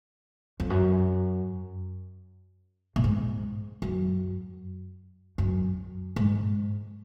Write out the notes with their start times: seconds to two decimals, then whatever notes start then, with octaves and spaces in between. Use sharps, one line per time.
0.60 F2
0.70 F#2
2.96 A#2
3.04 G#2
3.82 F#2
5.38 F#2
6.16 G#2